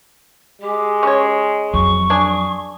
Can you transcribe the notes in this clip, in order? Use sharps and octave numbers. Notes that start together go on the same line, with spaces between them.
G#3 G4
C#4 C#5
F2 F#3 C#6
D4 G#4